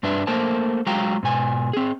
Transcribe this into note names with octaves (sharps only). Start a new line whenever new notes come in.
G2 D4 B4 E5
A3 A#3 A#4 C5 A5
F#3 G#3 F5 G5 A#5
G#2 B2 G#5
C4 G#4